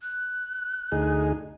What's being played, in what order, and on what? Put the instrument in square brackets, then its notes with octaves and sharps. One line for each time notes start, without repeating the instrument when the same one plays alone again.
[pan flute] F#6
[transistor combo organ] D2 D#4 G#4